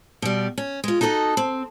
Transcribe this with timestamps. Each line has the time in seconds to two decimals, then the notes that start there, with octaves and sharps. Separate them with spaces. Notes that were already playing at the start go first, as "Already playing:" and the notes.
0.22 B2 G3
0.58 C#4
0.84 G#3 F4
1.01 D#4 F#4 A4 C#5 D#5
1.37 C4